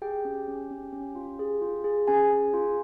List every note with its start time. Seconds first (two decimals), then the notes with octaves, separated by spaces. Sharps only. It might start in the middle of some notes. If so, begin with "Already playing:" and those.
0.02 G4 G#4 G5
0.25 C#4
0.48 C#4
0.71 C#4
0.92 C#4
1.15 F4
1.39 G#4
1.62 F4
1.84 G#4
2.07 C#4 G#4 G#5
2.31 G#4
2.54 F4